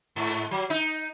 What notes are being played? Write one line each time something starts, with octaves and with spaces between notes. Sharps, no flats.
G#2
F#3
D#4